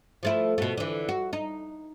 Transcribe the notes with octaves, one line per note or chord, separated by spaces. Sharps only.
F3 A3 E4
B2 A3
D3 E3
F#4
D#4